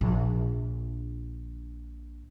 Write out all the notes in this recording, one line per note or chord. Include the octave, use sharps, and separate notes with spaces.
A#1 D3